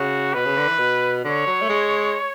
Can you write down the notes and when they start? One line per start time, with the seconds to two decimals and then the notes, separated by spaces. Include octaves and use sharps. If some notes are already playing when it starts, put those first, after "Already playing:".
Already playing: C#3 F#4
0.34 B2 B4
0.46 C#3
0.57 D3
0.68 E3
0.79 B2
1.24 D3 C#5
1.47 F#3
1.62 A3
1.69 G#3